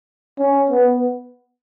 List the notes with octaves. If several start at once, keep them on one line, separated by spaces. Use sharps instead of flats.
C#4
B3